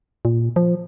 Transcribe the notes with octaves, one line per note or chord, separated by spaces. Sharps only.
A#2
F3